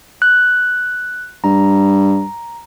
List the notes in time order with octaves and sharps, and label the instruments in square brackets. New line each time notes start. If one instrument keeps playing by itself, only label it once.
[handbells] F#6
[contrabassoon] G2 [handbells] A#5